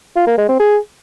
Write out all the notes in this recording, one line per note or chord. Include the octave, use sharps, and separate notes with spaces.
F4
A#3
G#3
C4
G#4